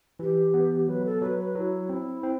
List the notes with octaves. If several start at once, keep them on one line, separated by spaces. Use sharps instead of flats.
E3 G4
B3
F#3 B4
A4
F#3 B4
B4
F#3 E4
C4
C4